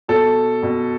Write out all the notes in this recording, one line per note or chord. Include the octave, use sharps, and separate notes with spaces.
B2 A4
B2